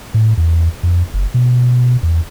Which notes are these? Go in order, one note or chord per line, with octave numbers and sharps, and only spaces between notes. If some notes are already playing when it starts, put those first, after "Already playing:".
A2
E2
F2
F#1
B2
E2